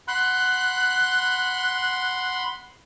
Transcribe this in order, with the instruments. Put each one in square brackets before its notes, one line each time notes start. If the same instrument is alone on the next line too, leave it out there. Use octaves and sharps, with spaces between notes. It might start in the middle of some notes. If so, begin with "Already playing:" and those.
[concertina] F#5 B5 C6 [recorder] F#6